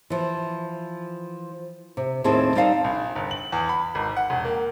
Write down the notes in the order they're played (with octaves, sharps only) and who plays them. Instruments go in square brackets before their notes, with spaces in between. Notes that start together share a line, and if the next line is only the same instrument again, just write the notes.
[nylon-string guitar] E3 F3
C3
D#2 A2 C4 E4 G#4 A5
G3 C4 D#4 D5 F5 A5
[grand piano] A#1
G1
F#7
E2
B5
G#1
F#5
E1
A#3